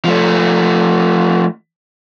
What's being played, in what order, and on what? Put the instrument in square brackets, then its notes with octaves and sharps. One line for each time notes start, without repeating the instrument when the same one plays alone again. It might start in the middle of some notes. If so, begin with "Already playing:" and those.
[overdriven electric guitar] F3 A3